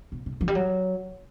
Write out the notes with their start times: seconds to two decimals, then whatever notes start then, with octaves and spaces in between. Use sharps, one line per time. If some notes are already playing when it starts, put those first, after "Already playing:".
0.12 B2
0.26 C3
0.41 F3
0.48 G3
0.55 F#3